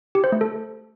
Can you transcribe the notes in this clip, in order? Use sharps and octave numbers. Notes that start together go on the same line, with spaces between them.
G4
C5
A3
A4